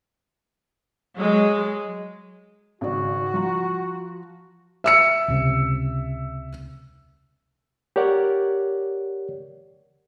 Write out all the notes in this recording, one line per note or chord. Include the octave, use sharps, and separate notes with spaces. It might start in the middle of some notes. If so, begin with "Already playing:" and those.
F#3 G#3
G#1 C#3 F#4 D5
F3 A#5
E5 E6 C#7
C#2 C3
G4 A#4 C#5 D5 F#5